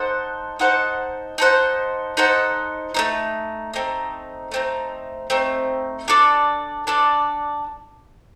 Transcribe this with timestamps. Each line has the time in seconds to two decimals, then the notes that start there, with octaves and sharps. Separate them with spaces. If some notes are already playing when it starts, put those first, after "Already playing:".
Already playing: D#4 A4 C5 F#5
0.59 D#4 A4 C5 F#5
1.38 D#4 A4 C5 F#5
2.17 D#4 A4 C5 F#5
2.94 A3 C4 D#4
3.74 A3 C4 D#4
4.52 A3 C4 D#4
5.30 A3 C4 D#4
6.08 D4 A4 D5
6.87 D4 A4 D5